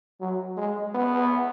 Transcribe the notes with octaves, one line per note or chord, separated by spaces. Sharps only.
F#3
G#3
B3